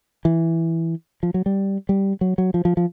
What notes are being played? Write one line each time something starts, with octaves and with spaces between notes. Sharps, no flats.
E3
F3
F#3
G3
G3
F#3
F#3
F3
F3
F3